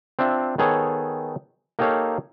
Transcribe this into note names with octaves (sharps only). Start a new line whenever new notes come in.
C4 D4 F4 E5
D#3 B3 G#4 A4 C#5
A#3 D#4 G4 A4 C#5 F5